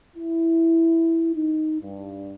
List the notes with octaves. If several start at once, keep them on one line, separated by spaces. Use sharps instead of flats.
E4
D#4
G2